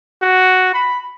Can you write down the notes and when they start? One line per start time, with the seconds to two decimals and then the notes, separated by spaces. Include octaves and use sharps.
0.22 F#4
0.74 B5